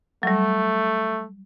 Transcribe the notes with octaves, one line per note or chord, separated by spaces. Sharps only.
F#3 G3 A3